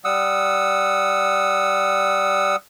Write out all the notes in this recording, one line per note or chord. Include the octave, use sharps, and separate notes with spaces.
G3 F#5 D#6 E6